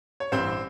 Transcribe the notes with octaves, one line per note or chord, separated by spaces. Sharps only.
C#5
A1 G2 E3 G3 C4 C5